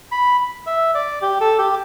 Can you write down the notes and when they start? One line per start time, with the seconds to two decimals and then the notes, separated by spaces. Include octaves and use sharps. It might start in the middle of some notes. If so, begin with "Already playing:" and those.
0.12 B5
0.66 E5
0.94 D5
1.22 G4
1.40 A4
1.58 G4